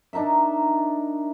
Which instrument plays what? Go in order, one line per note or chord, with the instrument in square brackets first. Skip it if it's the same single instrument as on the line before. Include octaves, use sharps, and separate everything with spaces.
[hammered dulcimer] D4 D#4 A#4 E5